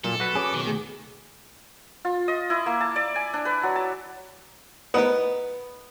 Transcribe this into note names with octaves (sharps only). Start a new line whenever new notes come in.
A#2 F#3 A4
F#4 B4
C#4 G#4 D6
B2 D#3
A3 G#4
F4
D#5
E4
A#3
A5
D5
G#5
D4
B4
F#3
A5
B3 D#4 A#4 B4